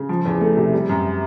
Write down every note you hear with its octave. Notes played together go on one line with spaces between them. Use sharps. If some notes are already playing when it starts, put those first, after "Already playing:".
Already playing: C#3
F3
E2
A3
C3
G3
F#2